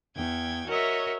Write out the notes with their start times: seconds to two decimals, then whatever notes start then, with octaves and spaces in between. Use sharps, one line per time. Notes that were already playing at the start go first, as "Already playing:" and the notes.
0.15 E2 G5 G#6
0.66 F#4 A#4 C#5 D#5 E5